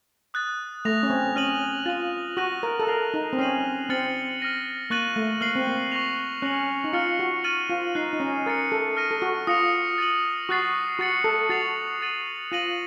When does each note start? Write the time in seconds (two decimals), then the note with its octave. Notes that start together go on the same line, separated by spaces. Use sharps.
0.34 D#6 F#6 A6
0.85 A3 D#6 A#6 F7
1.03 C#4
1.10 C4
1.36 C#4 F6 A#6 D#7 F#7
1.86 F4 A6 D#7 F#7
2.37 F#4 F#6 A#6 D#7 F#7
2.63 A#4
2.79 A4
2.87 A#4 F6 C7 F7
3.14 D#4
3.33 C4
3.38 C#4 F6 C7 D#7 F#7
3.89 C4 F6 A6 C#7 F#7
4.40 F6 A#6 D#7
4.90 A#3 C#6 F#6 A6 D#7 F#7
5.16 A3
5.41 A#3 F6 C7 F#7
5.55 C4
5.67 A#3
5.92 C#6 F#6 A#6 F7
6.42 C#4 F#6 A#6 C#7 F#7
6.84 D#4
6.93 F4 F6 A6 C#7
7.19 F#4
7.44 F6 A6 D#7 F#7
7.70 F4
7.95 D#4 F#6 C7 F#7
8.13 D#4
8.20 C#4
8.45 A#4 D#6 A6 C#7
8.72 A4
8.97 F6 A#6 D#7
9.11 A4
9.22 F#4
9.47 F4 D#6 A#6 C#7 F7
9.98 A6 D#7 F#7
10.49 F#4 C#6 F#6 A6 C7
10.99 F#4 C#6 A6 C#7 F#7
11.24 A4
11.50 F#4 A6 C7 F7
12.01 C#6 A6 D#7 F#7
12.51 F4 F#6 A#6 D#7 F#7